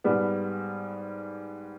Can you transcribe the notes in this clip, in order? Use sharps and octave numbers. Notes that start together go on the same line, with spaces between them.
G#2 G3 B3